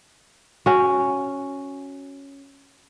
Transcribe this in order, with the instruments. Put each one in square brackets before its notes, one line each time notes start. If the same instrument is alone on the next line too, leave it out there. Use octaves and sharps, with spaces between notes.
[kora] C#4 F#4